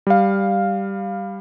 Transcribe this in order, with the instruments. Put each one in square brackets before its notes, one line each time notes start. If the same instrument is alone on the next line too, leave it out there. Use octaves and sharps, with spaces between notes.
[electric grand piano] G3 F5